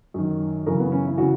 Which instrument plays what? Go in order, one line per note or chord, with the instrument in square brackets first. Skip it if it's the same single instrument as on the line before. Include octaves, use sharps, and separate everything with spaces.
[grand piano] F#2 D#3
F#2 C#3 E3 A#4
B3
C#4
E4
C#3 E3 F#4